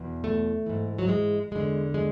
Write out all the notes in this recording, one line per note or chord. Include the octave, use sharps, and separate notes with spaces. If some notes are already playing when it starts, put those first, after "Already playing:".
Already playing: E2 B2
A3
G#2 E3
F#3
G#3
E2 D3 G#3
G#3